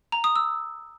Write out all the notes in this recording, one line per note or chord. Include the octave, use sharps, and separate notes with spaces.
A#5
D#6
E6